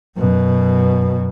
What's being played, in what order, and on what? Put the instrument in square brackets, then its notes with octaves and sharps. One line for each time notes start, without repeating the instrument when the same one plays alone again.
[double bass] F#2 B2